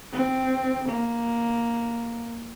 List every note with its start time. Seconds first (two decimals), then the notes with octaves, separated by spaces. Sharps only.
0.13 C4
0.89 A#3